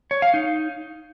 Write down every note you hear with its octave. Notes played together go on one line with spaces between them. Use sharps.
C#5
F5
D#4